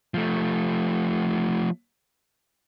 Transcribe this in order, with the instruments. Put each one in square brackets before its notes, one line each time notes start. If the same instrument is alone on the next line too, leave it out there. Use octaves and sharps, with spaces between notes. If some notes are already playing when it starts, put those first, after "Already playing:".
[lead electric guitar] F3 A3